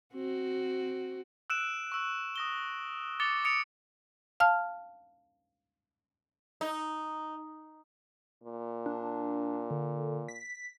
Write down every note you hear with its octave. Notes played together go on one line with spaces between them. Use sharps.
C4 F#4
E6 F#6 D7 E7
C#6 E6
D#6 A#6 G7
D6 A6 C#7 F7 G7
D#6 A6 C#7 D7 F7
F5 A5 F6
D#4
A#2
D4
D3
B6